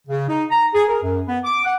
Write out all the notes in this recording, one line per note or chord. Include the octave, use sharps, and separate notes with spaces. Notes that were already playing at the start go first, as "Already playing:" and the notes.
C#3
D#4
A#5
G#4
A#4
F#2
B3
D6
F#5